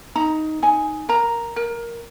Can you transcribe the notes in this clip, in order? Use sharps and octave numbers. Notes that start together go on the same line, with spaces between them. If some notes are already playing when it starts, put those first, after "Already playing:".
D#4 A#5
D#4 G#5
A#4 A#5
A#4